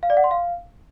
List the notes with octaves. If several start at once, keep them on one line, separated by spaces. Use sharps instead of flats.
F5
D5
F#5
C6
F5